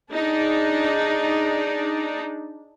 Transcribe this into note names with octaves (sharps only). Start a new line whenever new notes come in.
D4 D#4 G#4 D5